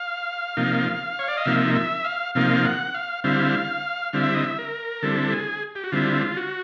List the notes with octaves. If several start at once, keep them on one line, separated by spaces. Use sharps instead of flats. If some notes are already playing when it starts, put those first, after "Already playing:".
Already playing: F5
C3 F3 A#3 D#4
C#5
D5
D#5
C3 F3 A#3 D#4 E5
E5
F5
C3 F3 A#3 D#4 F5
F#5
F5
D3 G3 C4 E4 F5
D3 G3 C4 E4 F5
E5
D#5
E5
A#4
D3 G3 C4 E4 A4
G#4
G4
F#4
D3 G3 C4 E4 F4
F#4